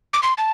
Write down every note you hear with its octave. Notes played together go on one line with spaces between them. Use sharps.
D6
C6
A5